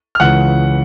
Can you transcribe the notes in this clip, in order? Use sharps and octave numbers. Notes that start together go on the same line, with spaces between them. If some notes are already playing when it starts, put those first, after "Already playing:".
F6
C#2 C#3 E3 F#5 F#6